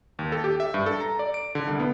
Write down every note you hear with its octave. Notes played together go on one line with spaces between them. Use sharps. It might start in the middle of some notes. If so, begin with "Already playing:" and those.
D#2
A4
G4
E5
G2
A4
A#5
D5
D7
D3
C2
B3